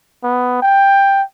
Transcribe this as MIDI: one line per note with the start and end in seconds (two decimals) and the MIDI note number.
0.23 0.58 59
0.62 1.22 79